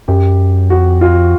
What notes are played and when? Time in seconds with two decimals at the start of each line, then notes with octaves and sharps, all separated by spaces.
0.08 F#2 G4
0.70 F2 F#4
1.01 F4